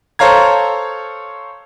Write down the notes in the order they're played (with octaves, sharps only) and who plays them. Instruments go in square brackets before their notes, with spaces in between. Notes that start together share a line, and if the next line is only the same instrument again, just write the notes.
[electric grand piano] A4 C5 C#5 F5 A#5 G#6